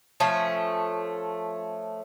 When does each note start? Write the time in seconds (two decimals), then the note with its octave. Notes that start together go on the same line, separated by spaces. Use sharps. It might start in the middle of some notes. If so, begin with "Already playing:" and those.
0.20 F3 A3 C#4